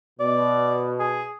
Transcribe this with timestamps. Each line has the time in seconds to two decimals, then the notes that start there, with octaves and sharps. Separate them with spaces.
0.20 B2 D5
0.99 G#4